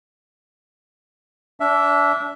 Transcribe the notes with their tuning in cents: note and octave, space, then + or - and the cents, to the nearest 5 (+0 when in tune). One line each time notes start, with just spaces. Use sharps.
D4 -30 E5 +5